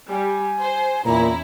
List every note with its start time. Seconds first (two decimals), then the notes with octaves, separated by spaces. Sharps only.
0.10 G3 G#5
0.62 C5
1.05 E2 A#2 C#4 E4 A#5